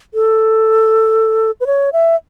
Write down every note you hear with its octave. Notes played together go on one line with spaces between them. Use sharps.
A4
B4
C#5
E5